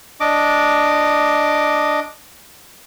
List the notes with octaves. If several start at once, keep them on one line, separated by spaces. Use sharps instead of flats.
D4 D#5 D6